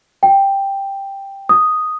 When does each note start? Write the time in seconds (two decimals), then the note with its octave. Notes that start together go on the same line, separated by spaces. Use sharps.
0.23 G5
1.49 D#6